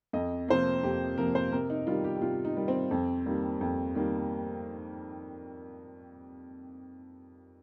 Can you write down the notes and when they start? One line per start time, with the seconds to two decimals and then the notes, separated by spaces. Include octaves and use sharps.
0.13 F2 D#5
0.48 C3 F3 A#3 C5
0.59 A#4
0.83 F2 G4
1.18 C3 F3 A#3 A#4
1.35 C5
1.52 C3 A#4
1.70 D#4
1.87 D#3 G3 F4
2.04 G4
2.15 G4
2.21 C3 F4
2.45 D#4
2.57 D#3 G3
2.68 C4
2.91 F2
3.26 D#3 G3 A#3
3.61 F2
3.95 D#3 G3 A#3